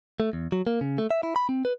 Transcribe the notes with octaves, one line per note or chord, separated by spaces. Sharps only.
A3
E2
F#3
A#3
C#3
A3
E5
E4
B5
C4
B4